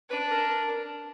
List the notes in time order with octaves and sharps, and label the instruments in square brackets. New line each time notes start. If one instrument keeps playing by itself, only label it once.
[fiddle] D4 [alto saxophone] B4
[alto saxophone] A#4